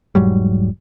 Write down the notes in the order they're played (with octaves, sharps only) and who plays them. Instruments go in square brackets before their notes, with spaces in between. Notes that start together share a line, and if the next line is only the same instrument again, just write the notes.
[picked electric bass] E1 G#2 F#3 G3